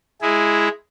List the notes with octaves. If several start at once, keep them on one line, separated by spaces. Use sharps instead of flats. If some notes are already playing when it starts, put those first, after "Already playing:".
G#3 E4 G#4